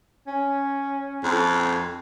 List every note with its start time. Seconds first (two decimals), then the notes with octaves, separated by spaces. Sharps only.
0.27 C#4
1.24 F2